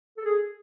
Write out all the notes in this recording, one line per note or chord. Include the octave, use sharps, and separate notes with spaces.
A4
G#4